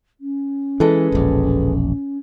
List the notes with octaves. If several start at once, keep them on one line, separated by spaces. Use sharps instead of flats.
C#4
E3 G#3 A4 B4
E1 A#1